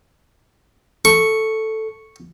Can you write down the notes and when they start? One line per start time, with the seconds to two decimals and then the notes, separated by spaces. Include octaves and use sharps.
1.05 A4 C#6